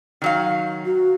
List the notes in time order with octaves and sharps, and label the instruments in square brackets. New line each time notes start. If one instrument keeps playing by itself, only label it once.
[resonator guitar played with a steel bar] D#3 F#3 F5
[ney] F#4